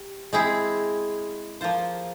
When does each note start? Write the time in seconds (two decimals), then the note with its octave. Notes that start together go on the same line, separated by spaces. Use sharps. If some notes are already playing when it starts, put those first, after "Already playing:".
Already playing: G4
0.33 G#3 C4 E4 G#4
1.61 F3 A#3 F4 C5